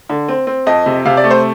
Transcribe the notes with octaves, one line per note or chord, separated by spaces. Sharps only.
D3
C4
C4
F2 D#5
C3
C3 F5
D5
A3
C5